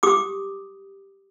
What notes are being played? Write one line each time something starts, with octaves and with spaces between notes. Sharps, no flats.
G4 D6 D#6